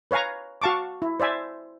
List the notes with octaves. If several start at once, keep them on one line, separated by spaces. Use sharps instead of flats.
B4 C#5 F5 G#5 A#5
F#4 F5 A5 C#6 D6
E4
C5 D5 E5 G#5